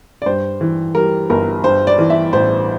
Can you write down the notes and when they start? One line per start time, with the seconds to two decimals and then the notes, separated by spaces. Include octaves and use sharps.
0.22 D5
0.26 G2 C5
0.61 E3
0.95 G3 A#4
1.30 G1 A#4
1.64 G2 C5
1.87 D5
1.99 E3
2.10 E5
2.33 A1 C5